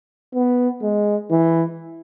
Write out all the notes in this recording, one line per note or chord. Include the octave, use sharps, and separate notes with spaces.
B3
G#3
E3